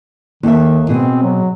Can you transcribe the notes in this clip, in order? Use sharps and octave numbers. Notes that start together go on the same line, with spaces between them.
D#2 D#3 A4 E5
B2 C4 G#4
F#3